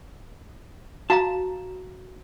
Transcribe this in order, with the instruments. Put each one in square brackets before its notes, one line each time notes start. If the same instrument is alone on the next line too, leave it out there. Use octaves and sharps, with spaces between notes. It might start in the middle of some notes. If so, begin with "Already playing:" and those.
[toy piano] F#4 F5 A#5 [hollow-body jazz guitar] A5